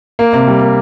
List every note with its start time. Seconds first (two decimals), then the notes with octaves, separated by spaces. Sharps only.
0.19 A#3
0.33 C3
0.47 G3
0.61 A#3